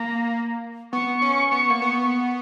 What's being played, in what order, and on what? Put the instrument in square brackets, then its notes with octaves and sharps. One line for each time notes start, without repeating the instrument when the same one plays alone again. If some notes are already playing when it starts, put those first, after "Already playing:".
Already playing: [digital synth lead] A#3 [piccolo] A#5
[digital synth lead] B3 [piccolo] C#6
[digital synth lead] C#4
B3
A#3
B3